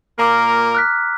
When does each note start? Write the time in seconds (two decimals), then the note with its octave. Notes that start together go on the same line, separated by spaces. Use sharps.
0.19 A#2 A#3 A#4 A#5 D6
0.75 F6 F#6 B6